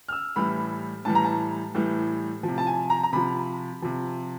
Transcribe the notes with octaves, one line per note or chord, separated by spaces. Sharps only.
F6
E6
A2 E3 G3 B5
A2 E3 G3 A5
A#5
A5
A2 E3 G3
F3
C3
A5
G#5
A#5
A#5
C3 F3 B5
C3 F3